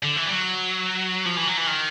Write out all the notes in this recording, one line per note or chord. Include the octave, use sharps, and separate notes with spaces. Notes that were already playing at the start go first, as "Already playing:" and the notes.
D3
E3
G3
F#3
F3
E3
F#3
E3
D#3